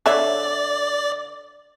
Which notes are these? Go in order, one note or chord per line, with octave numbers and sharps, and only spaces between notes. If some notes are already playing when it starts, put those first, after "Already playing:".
D3 C#5 D5 E5